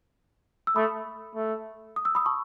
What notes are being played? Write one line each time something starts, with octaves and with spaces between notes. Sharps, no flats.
E6
A3 B5 D#6
A3
D#6
E6
B5 D#6
A5 C#6